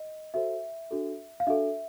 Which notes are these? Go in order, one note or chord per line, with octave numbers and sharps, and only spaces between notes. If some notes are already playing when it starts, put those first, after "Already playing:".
Already playing: D#5
F#4 A4 C5 E5
D4 F#4 A4
F5
D4 F#4 A4 E5